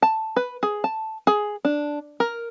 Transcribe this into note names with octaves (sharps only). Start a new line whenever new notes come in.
A5
B4
G#4
A5
G#4
D4
A#4